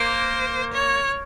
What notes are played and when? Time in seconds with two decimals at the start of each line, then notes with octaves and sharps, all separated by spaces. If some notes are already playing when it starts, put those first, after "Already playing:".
Already playing: A#3 C5
0.72 C#5